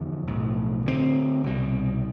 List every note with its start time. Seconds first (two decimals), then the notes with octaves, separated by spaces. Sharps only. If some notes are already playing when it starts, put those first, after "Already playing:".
Already playing: E2 D3 F3 B3
0.27 B1 A2 F3
0.85 D2 D3 G3 C4
1.44 C2 B2 G3